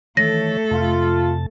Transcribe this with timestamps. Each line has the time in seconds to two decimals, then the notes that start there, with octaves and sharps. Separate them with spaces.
0.17 D#3 E3 A3 A4 C#5 A#6
0.71 F2 C3 F4 A5